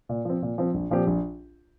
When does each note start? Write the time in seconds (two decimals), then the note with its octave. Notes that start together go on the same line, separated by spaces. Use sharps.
0.09 A#2
0.25 F3 C4
0.42 A#2
0.58 F3 C4
0.74 A#1
0.90 A#2 F3 C4 G4
1.07 A#1